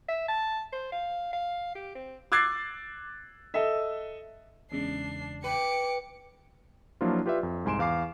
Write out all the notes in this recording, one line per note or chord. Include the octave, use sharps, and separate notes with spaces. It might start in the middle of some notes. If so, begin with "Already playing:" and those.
E5
A5
C5
F5
F5
G4
C4
D6 E6 F#6 G#6 A6 C7
A4 D#5 E5
E2 C#3 G#3 D4 C7
B4 G5 D6 C#7
F3 F#3 A#3 D4 E4 F4
F4 G4 B4 D5 E5
F2
C2 G#2 G#5 C6 D7 E7
E2 F5 D6 C7